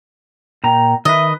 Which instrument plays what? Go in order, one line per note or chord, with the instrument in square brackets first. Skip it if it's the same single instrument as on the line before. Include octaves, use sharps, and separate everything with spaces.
[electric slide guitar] A#2 A#5 [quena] G5
[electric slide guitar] D#3 B4 [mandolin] D#5 [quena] E5